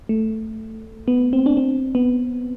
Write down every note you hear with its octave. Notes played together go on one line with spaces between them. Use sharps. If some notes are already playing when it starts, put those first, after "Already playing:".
A3
B3
C4
D4
C4
B3